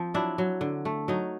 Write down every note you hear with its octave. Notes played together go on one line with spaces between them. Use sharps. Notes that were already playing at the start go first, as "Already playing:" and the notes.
Already playing: F3 C4
F#3 D4 E4
F#3
D3
A3
F#3 D#4